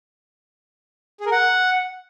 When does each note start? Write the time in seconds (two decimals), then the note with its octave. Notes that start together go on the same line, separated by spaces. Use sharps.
1.20 G#4
1.26 A#4
1.32 F#5